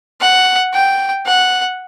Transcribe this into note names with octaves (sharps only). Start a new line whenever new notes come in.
F#5
G5
F#5